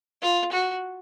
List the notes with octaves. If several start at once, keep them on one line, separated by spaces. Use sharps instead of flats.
F4
F#4